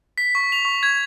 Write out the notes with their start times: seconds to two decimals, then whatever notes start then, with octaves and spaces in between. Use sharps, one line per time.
0.18 B6
0.35 C#6
0.52 F7
0.65 C#6
0.83 G#6